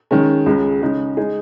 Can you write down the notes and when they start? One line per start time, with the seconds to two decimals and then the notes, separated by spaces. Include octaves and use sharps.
0.11 D#3 G#3 C#4
0.46 C#2 C#3 G#3
0.82 C#3 G#3 D#4
1.17 G#3 D#4 G#4